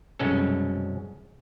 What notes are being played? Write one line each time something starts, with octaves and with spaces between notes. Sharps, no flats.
C2 F#2 B2 G#3 C#4 A4